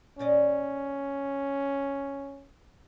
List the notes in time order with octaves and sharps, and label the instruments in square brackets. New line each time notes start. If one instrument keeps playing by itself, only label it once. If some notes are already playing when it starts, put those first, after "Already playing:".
[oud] A#2 D5 D#5 [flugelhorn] C#4